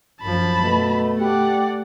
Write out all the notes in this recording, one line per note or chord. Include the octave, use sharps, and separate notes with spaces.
F#2 F3 A5 B5
B2 A3
G4 D5 F#5